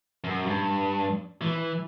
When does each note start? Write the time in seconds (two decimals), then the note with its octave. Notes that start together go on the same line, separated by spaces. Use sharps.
0.24 F#2
0.47 G2
1.41 E3